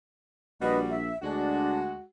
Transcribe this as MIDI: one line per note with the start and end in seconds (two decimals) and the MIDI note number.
0.61 1.11 34
0.61 0.99 55
0.61 0.99 62
0.61 0.99 66
0.61 0.79 71
0.61 0.79 75
0.90 1.17 76
1.22 1.95 38
1.22 2.02 56
1.22 1.80 62
1.22 2.02 66